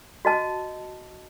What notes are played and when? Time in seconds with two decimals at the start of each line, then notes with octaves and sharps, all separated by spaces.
0.25 F#4 D#5 A5